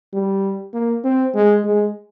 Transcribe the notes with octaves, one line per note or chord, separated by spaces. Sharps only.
G3
A#3
C4
G#3
G#3